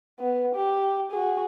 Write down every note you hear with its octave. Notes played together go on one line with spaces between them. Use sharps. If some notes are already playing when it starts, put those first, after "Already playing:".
B3
G4
F#4 G#4